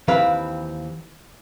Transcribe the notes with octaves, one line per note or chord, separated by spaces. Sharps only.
D#2 E3 C4 B4 F5